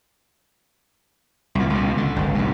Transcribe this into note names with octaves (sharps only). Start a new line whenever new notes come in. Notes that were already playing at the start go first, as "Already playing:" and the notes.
C2 A#2
C#2 B2
D3
G1 C#2
B1 G2